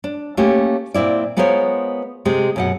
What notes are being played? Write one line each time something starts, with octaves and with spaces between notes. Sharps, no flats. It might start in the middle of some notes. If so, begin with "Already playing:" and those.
D4
A3 A#3 C#4 G4
A#2 C4 E4 D5
G#3 B3 F4 A#4 C5 C#5
C3 G#3
F#2 B2 F#5